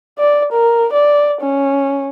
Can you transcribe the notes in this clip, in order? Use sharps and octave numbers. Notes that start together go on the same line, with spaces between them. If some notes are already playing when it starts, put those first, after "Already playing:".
D5
A#4
D5
C#4